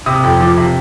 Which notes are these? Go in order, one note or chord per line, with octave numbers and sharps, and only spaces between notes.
C3 D#6
F2
F3 D6
C3